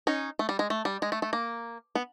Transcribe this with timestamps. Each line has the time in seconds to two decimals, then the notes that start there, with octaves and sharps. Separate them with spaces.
0.07 C#4 D#4
0.39 A3
0.49 G3
0.59 G#3
0.70 A3
0.85 G3
1.02 G#3
1.12 A3
1.22 A3
1.33 A#3
1.95 B3